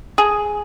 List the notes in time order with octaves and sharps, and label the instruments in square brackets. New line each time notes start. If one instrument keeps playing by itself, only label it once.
[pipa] G#4